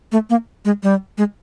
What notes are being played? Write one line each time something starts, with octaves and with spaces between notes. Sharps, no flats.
A3
A#3
G#3
G3
G#3